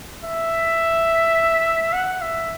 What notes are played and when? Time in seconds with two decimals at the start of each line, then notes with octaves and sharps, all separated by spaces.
0.24 E5
1.93 F#5
2.22 E5